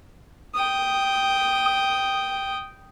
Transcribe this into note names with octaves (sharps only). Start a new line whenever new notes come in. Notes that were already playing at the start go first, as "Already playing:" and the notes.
G5 D#6